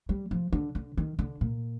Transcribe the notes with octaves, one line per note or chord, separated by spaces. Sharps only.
G3
F3
D3
D3
D#3
D3
A#2